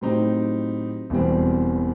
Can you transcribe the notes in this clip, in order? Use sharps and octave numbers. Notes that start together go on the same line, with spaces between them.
A2 F#3 C4 D#4 G4
E1 E2 B2 G3 C4